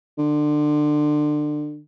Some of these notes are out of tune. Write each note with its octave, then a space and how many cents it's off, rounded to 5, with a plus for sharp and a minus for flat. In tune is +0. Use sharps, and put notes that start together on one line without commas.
D3 +25